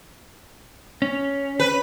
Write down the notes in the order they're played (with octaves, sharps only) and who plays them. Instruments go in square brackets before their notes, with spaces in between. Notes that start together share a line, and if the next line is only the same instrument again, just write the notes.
[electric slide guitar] C#4
[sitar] B4